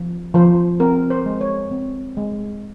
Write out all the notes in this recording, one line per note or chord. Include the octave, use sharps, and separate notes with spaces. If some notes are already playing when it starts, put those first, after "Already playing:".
Already playing: F3
F3 C5
C4 A#4
C5
G#3
C#5
C4
G#3